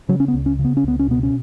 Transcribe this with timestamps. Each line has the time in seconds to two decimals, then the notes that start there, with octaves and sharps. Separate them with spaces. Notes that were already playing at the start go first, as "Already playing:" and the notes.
0.09 C#3 F#3
0.20 C#4
0.28 B3
0.34 C#2
0.46 C#4
0.59 C#3
0.65 B3
0.77 C#4
0.84 C#2 B3
0.99 C#4
1.08 B2 B3
1.23 C#4